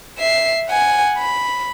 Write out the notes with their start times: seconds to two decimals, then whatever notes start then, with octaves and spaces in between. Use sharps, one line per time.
0.18 E5 C7
0.69 F#5 G#5
1.18 B5